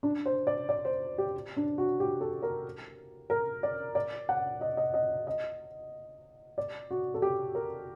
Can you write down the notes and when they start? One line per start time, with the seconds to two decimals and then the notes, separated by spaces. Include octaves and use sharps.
0.03 D4
0.26 C5
0.47 D5
0.69 D5
0.85 C5
1.18 G4
1.57 D4
1.78 F#4
2.00 G4
2.21 A4
2.43 A#4
3.30 A#4
3.63 D5
3.95 D5
4.29 F#5
4.61 D#5
4.77 D#5
4.94 D#5
5.27 D#5
6.58 D5
6.91 F#4
7.14 A4
7.22 G4
7.55 A#4